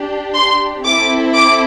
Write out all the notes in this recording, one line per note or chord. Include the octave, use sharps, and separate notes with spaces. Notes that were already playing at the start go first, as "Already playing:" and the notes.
Already playing: D4 G4
C6
C4 E4 A4 D6
D6